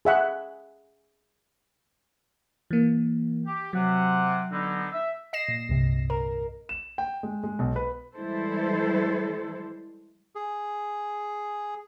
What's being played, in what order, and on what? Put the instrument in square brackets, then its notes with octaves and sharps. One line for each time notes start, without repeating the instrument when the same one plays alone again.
[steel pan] G#4 E5 F#5
[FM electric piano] E3 A#3
[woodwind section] G4
[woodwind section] C3 F#5 [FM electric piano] F#3
[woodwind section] D3 B3 D#4
E5
[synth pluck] D#5 A#6 C7 E7
A#2
C2 G2 C3
A#4
[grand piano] E7
G5
G#3
G#3
B1
B4
[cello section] E3 G3 G#3 E4 A4 C5
[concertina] G#4